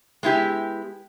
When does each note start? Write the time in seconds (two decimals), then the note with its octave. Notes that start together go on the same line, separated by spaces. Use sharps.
0.23 G#3 B3 E4 G4